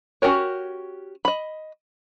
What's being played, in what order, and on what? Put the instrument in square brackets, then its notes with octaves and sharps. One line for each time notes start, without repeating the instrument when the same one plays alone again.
[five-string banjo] C#4 F#4 G4 A#4 C#5
D#5 B5